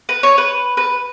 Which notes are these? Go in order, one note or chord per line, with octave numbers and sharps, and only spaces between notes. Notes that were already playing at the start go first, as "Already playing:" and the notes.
B4
C#5
B4
B4